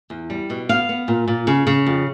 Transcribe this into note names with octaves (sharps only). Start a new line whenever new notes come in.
E2
G3
B2
B3 F5
B3
A#2
A#2
C#3
C#3
F2